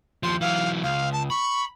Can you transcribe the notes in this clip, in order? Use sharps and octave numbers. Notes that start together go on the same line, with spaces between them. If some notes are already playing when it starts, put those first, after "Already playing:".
D#2 F3 C6
E3 F#3 F5
C#2 F5
A5
B5 C#6